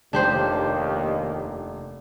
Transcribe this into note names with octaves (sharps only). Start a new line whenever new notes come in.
F1 D#2 D4 G4 C5